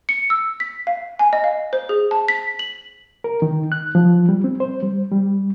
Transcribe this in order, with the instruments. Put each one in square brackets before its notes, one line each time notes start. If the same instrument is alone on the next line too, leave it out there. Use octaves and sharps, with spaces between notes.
[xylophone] C#7
E6
B6
F5
G#5
D#5
F5
C5
G#4
A5
B6
F#7
[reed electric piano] A#4
D#3
F#6
F3
G3
C4
C5
G3
G3